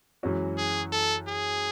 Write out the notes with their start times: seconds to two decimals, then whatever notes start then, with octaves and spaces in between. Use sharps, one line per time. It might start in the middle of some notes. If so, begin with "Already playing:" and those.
0.23 F#2 E3 G#3 C#4 F#4
0.58 G#4
0.92 A4
1.28 G#4